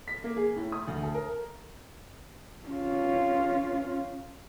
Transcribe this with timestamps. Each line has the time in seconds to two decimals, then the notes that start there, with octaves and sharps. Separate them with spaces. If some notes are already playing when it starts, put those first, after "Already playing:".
0.08 B6
0.24 A#3
0.36 G#4
0.56 A2
0.72 D#6
0.88 D2
1.03 A4
1.14 A#4
2.68 C#4 F4